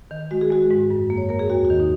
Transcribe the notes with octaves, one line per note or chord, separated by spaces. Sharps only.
D#3
G#3 F#4
G#4
G#3 F#4
G#2
F#2
A#3
C#5
A#3 A#4
G#4
D#2 F#4
F#4
D#3
D#4